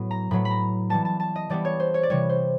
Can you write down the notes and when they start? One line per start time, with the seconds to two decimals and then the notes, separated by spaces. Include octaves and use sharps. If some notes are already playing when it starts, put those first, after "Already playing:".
Already playing: A2 F#3 B3
0.11 A#5
0.31 A2 F#3 B3 B5
0.45 B5
0.51 A#5
0.90 E3 G3 B3 A5
1.05 A5
1.20 A5
1.36 D#5
1.50 E3 G3 B3 D5
1.65 C#5
1.80 C5
1.94 C#5
2.03 D5
2.10 C3 E3 G3 C#5
2.29 C5